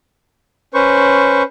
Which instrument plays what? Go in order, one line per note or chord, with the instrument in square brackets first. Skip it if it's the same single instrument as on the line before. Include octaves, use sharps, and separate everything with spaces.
[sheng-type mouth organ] C#4 B4 C5 C#6